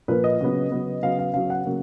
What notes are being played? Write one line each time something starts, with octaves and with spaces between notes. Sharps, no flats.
A#2 F3 A#3 B4
D#5
C#3 F#3 B3
C#3 F#3 B3
C#3 F#3 B3 F5
F5
C#3 F#3 B3 F5
F#5
C#3 F#3 A#3